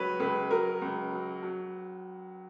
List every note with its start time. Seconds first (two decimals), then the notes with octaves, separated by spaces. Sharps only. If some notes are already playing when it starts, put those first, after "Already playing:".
Already playing: C#2 F#3 B4 C#5
0.20 C#2 B4
0.50 F#3 A#4
0.82 C#2
1.13 F#3
1.43 F#3